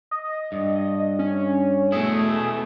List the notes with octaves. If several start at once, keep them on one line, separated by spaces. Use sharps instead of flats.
D#5
G2
C#4
B2 A3 B3 E4 G#4